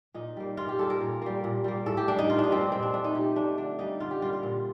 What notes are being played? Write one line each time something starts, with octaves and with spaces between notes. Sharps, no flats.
A#2 D#4
G3 A#3
A#2 F4
G4
G3 A#3 A4
A#4
A#2
G3 A#3
A#2
G3 A#3
A2 A4
G4
G3 A#3 D4
D#4
A2 F4
D4
D#4
G3 A#3 C4
D4
A#2 C4
D4
A3 D4
D#4
A#2 G4
A3 D4
D3 D4
G3 A#3 D#4
D3 F4
G4
G3 A#3 F4
F4
A#2